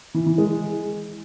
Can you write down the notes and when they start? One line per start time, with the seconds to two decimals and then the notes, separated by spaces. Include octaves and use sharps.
0.15 E3
0.26 E3
0.38 G#3